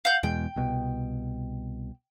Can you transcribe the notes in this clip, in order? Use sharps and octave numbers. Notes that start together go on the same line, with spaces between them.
F5 F#5 G6
E2 B2 G#3 G5
C2 B2